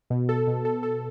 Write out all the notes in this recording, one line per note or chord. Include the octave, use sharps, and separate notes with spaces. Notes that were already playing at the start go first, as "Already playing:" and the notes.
B2
A4
B2
A4
A4